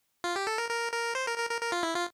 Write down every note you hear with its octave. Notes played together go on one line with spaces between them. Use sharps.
F4
G4
A4
A#4
A#4
A#4
C5
A#4
A#4
A#4
A#4
F4
E4
F4